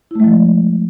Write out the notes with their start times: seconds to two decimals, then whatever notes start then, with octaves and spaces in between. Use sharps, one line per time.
0.11 E4
0.15 A3
0.20 G#3
0.24 F3